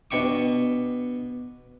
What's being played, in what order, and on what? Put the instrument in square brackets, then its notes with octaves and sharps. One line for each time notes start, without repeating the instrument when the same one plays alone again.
[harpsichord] B2 D4 G5 C#6 D6